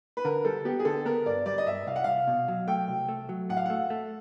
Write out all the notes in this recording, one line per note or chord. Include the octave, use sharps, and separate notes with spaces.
B4
D3 A#4
G3 A4
B3 G4
G#4
D3 A4
B3 A#4
G2 D5
G3 D5
D#5
G2 E5
C2 F5
F#5
C2 F5
B2
F#3
A3 G5
C2
A3
F#3
A2 F#5
F5
A3 F#5
A3